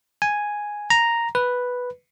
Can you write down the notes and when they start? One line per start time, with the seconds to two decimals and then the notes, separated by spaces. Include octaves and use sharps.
0.22 G#5
0.90 A#5
1.35 B4